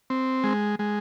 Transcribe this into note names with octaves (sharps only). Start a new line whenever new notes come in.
C4
G#3
G#3